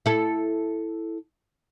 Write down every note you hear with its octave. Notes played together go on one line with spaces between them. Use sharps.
E4 A4